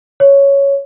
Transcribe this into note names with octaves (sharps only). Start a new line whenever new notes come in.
C#5